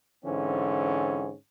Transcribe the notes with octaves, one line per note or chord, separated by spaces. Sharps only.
G#2 D3 E3 C4 C#4